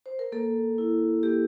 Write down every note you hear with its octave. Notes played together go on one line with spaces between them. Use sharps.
C5
A#4
A#3 A4
E4
A#3 G4